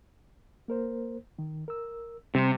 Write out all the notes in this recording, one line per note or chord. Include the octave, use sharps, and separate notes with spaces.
A#3 A#4 C5
D#3
A#4 E6
C3 G3 C4